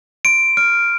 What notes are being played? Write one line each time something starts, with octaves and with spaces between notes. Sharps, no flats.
C6 D7
F6 D7